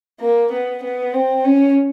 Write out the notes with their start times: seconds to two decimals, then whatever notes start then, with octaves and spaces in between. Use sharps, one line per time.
0.20 A#3
0.52 B3
0.83 B3
1.13 C4
1.44 C#4